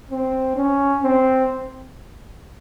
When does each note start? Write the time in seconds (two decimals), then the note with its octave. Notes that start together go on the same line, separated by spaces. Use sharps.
0.11 C4
0.56 C#4
1.03 C4